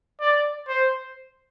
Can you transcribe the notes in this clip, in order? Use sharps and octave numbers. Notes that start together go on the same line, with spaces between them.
D5
C5